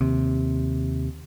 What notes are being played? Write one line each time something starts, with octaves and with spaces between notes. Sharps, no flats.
D#2 C3